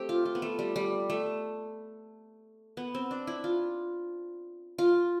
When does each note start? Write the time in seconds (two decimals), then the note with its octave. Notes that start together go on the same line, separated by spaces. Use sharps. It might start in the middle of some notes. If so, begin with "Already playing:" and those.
Already playing: A3 C4 G4
0.09 F4
0.26 F4
0.35 B3
0.42 A3
0.59 G3
0.76 G3
1.10 A3
2.77 B3
2.95 C4
3.11 D4
3.27 E4
3.44 F4
4.78 F4